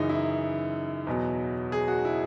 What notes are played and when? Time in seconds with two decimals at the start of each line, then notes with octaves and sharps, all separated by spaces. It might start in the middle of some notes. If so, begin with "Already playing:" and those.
Already playing: F#2 C#3 E3 D#4
0.09 E4
1.07 E2 B2 F#3
1.72 G#4
1.88 F#4
2.05 E4